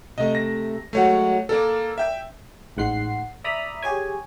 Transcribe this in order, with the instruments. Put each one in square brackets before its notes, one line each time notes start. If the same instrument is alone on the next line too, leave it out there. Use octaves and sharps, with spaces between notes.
[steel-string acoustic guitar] C3 A3 [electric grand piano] D#5
[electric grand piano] A#6
[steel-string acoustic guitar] F#3 G#3 F#4 [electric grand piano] A3 C#5 F#5
[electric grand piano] A#3 A4 [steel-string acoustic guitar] A#4 D5
[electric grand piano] E5 G5
[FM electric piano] A1 G#2 F#5 C6 C7
D5 E5 A#5 B5 D#6
G4 G#4 C#5 G#5